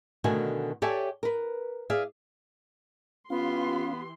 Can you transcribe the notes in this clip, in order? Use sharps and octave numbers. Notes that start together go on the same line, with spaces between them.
B2 D3 D#3 A3 F#4 G#5
G4 A4 C#5 D5 E5 G#5
A#4 B4
G#4 D5 E5 F5
E3 B3 C#4 F4 G4 F5 C6